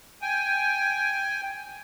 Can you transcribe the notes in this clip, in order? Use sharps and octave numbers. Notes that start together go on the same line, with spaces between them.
G5 G#5